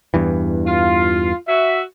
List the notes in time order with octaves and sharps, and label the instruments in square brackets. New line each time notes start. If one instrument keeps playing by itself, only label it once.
[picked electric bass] E2 G2 E3
[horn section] F4
F#4 E5